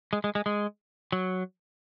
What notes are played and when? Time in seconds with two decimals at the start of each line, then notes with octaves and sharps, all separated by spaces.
0.13 G#3
0.24 G#3
0.35 G#3
0.46 G#3
1.12 F#3